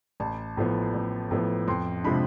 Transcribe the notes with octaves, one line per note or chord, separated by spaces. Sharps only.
A1 A5
A2 F3 B3
A1
A2 F3 B3
F2 C6
C3 F3 G#3 D4 B5